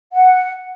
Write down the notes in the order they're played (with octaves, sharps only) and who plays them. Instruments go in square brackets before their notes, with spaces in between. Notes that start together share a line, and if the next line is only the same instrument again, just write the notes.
[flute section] F#5